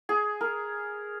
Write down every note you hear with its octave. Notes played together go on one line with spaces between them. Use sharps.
G#4
A#4